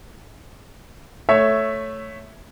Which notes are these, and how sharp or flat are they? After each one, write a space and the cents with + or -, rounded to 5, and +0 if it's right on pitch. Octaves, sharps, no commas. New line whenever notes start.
A3 +0 C#5 +0 E5 +0